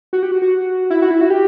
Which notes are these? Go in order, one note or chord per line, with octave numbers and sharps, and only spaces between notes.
F#4
G4
F#4
F#4
E4
F#4
E4
F#4
G4